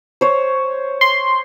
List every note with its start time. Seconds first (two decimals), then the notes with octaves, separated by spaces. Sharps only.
0.21 C5 C#5
1.01 C6